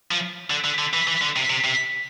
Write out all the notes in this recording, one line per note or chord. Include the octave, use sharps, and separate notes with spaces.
F3
D3
D3
D3
E3
E3
D3
C3
C3
C3